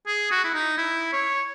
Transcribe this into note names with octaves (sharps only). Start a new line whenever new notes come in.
G#4
F#4
E4
D#4
E4
C#5